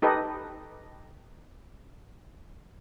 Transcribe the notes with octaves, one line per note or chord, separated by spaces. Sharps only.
D#4 G4 A4 B4 D#5